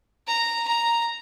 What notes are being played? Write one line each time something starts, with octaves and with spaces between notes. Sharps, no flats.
A#5
A#5